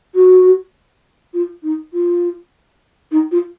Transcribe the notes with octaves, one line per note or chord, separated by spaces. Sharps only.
F#4
F4
D#4
F4
D#4
F4